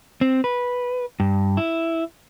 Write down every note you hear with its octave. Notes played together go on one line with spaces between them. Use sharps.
C4
B4
G2
E4